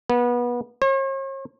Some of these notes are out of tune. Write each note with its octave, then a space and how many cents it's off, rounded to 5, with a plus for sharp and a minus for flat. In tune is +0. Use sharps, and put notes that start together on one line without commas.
B3 -25
C#5 -45